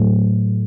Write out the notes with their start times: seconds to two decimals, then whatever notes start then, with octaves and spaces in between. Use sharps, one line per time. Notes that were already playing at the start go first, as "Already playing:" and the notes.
Already playing: A2 F#3 A3